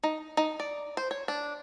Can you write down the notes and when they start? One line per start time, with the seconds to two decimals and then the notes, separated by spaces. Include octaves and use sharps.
0.03 D#4
0.37 D#4
0.60 D5
0.97 C5
1.11 C#5
1.28 D4